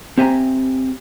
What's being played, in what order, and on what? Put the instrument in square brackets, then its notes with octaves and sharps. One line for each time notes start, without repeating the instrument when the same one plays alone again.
[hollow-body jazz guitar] C4 G4 E5 G#5 A#5